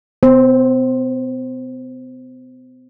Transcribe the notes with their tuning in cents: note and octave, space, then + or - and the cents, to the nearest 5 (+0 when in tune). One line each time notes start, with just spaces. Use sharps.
B3 +45 C5 +10